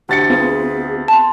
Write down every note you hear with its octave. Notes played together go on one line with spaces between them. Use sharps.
D2 G4 A6 C#7
B3 C4 F4 G#4
A5 C6